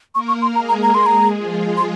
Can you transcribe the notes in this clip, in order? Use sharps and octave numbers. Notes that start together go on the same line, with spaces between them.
A#3 A#4 C#6
C#6
C6
G#3 G#4 A#5
A#5
A#5
G#3 G#4 C6
A#5
F3 F4
C6